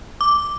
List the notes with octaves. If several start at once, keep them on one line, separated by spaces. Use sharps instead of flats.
D6